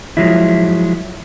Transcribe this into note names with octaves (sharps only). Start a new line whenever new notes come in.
F3 F#3 G#3 E4